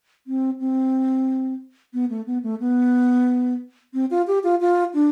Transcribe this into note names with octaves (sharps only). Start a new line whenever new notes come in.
C4
C4
B3
A3
B3
A3
B3
C4
F4
G4
F4
F4
D4